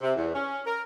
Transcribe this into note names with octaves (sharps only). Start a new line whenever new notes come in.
C3
E2
C#4
A#4